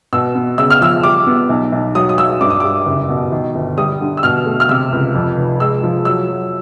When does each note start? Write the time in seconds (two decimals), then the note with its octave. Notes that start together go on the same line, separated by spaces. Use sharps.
0.13 B2 E6
0.35 B3
0.58 C#3 E6
0.70 F6
0.81 F3 E6
1.03 G3 D6
1.26 B3
1.49 B1
1.72 B1
1.95 F#3 D#6
2.09 D#6
2.17 F#3 E6
2.41 G2 D6
2.50 D#6
2.60 G3 D6
2.86 F#1
3.09 B2
3.32 D#3
3.55 G1
3.78 G3 D#6
4.01 D3
4.17 E6
4.23 B2 F6
4.46 A3
4.60 F6
4.69 C3 E6
4.92 C#2
5.15 F2
5.37 F1
5.60 G#3 E6
5.83 F3
6.05 F#3 E6
6.29 F#3